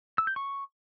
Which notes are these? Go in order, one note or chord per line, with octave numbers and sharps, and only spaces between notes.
E6
G6
C#6